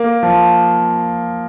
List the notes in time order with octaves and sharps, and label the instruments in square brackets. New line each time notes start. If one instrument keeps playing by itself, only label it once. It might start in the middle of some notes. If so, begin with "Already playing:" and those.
Already playing: [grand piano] A#3
F3